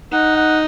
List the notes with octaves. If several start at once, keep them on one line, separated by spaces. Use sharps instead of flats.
D#4 F#5
F#5